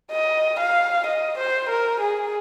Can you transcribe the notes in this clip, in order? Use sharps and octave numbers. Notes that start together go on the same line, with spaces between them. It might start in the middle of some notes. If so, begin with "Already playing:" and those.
D#5
F5
D#5
C5
A#4
G#4